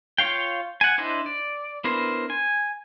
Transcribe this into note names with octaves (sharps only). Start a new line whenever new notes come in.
F4 C#5 F5 G5
F#5 G#5
D4 E4 C5 D#5
D5
B3 D4 E4 A#4 C5
G#5